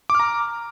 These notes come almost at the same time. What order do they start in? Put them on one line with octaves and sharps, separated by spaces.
D6 F6 A#5